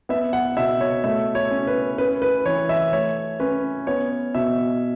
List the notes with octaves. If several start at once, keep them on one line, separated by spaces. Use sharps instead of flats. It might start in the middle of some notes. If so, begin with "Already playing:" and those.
B3 E5
F#5
B2 E5
C#5
A3 E5
C#5
C#4
B4
C#4 B4
B4
E3 C#5
E5
A3 C#5
C#4 B4
B3 C#5
B2 E5